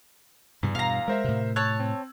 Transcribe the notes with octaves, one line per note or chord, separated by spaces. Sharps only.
E2 G2 C3 G3
G2 B2 F5 A#5
G#3 A#4 C5 E5
A2 C3
C#5 A5 E6 F#6 G#6
C4